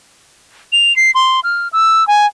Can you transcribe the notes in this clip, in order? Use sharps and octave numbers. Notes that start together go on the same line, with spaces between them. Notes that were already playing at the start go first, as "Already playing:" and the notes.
F7
C7
C6
F6
E6
G#5